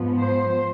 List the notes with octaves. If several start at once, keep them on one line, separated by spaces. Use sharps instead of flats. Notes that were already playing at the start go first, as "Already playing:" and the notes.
Already playing: G#2 F3 B3
C5